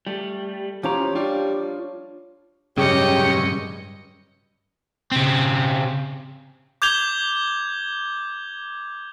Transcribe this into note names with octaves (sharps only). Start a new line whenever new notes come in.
G3 A3
E3 F3 C#4 G4 C#5 A#5
G3 D4 F4
G2 C#3 F#3 G4 C#5 D#5 G5 C#7
C#3 C4
D6 G6 G#6 F7 G7